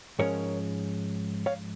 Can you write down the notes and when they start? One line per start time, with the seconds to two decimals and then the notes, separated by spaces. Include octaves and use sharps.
0.19 G#2 F3 G#3 C#4 A#4 C#5
1.46 C#5 F5